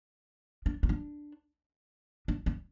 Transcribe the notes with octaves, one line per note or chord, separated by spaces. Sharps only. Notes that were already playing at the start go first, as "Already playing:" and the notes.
D4
D#4
D4
D4
C#4